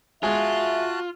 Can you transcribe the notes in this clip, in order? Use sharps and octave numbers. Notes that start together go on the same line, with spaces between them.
G#3 F4 F#4 E5 A5 F#6